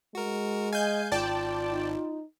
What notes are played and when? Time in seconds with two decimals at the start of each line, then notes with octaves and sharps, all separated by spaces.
0.15 G#3 F#4 A#4
0.73 D#5 F5 G#5 G6
1.12 G#1 F4 D5 G5 A5
1.72 D#4